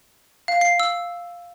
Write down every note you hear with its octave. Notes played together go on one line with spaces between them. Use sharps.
F5
C7
E6